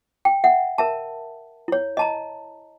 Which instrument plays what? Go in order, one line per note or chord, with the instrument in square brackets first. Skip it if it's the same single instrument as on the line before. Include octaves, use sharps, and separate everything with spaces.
[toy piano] G5
E5 F#5
A#4 E5 A5
E4 C#5
D#5 A5 A#5